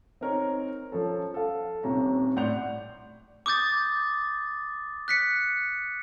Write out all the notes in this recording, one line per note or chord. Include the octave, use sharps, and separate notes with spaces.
C4 D#4 A#4 C#5
F3 C#4 A4
A4 F5
D#1 C3 C#4 A#5
A2 D5 F#5 C6 G6 F7
D6 D#6 G6 A6
F#6 B6 C#7